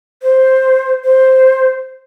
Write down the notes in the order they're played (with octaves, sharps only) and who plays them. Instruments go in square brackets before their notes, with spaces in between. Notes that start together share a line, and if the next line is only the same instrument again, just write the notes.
[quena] C5
C5